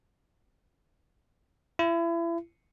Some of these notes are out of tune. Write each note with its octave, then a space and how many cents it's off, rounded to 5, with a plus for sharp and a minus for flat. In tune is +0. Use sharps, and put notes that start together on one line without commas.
E4 +35